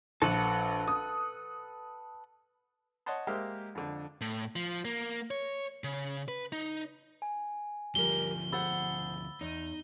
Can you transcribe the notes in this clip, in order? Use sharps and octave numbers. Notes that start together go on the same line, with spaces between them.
A#1 A4 B4 F#5
D#6
C#5 D#5 F#5 A5 C6
G#3 A#3 G4 C5 E5 F5
F2 D3
A2
F3
A#3
C#5
C#3
B4
D#4
G#5
D2 F3 G3 A#4 G7
G#4 C5 F#5 B5 E6 A6
E2 D#4